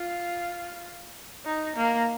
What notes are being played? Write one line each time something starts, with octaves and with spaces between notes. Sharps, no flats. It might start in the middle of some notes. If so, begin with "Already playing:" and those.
Already playing: F4
D#4
A#3